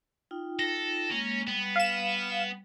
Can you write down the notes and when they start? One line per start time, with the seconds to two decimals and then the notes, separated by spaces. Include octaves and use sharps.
0.31 D#4 F4 G5
0.59 A4 A#6
1.11 G#3 A#3 C#4
1.48 G3 B3
1.76 F5 E7